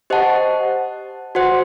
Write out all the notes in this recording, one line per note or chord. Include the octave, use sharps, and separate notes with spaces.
G4 C5 D#5 F#5 A5
F#4 C5 F#5